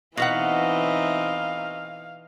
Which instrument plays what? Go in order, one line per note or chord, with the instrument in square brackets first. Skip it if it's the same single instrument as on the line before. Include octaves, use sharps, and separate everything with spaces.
[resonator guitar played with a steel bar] B2 B4 F#5 [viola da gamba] E3 C4 D#4 [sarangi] F5